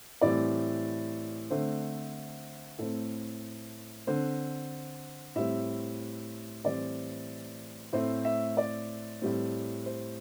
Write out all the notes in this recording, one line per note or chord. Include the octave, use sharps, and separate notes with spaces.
A2 E3 G3 C4 D5
D3 A3 C4 C5
A2 A3 C4 A4
D3 C4 C5
A2 G3 C4 E5
A2 E3 G3 C4 D5
A2 A3 C4 C5
E5
D5
A2 G3 C4
C5